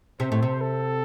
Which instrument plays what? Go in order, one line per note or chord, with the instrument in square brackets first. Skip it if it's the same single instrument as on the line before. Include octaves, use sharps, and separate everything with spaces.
[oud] C3 [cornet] C5
[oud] A2
C3
[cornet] A4